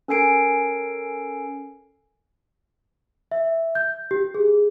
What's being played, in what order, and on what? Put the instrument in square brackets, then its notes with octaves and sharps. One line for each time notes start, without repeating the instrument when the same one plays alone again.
[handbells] C#4 A4 A#4 G#5 C7 D7
[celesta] E5
G6
G4
G#4